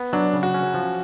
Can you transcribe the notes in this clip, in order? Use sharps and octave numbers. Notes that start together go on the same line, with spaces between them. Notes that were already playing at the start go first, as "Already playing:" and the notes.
Already playing: B3
F#3 D4
C#3
F#4
C#4
F3